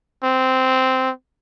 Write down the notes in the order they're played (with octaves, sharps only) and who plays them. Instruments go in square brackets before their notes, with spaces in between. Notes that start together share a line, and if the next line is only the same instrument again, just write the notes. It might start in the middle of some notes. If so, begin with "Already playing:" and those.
[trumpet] C4